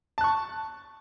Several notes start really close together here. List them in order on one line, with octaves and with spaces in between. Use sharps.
A5 F#6 C#6